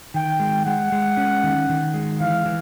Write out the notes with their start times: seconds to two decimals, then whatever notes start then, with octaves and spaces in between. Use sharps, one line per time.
0.14 D#3 G5
0.40 G#3
0.65 G#3 F#5
0.92 G#3
1.17 C#4
1.44 D#3
1.69 D#3
1.94 G#3
2.20 E3 F5
2.46 E3